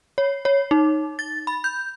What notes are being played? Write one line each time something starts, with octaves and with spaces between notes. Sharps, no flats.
C#5
C#5
D#4
A6
B5
G6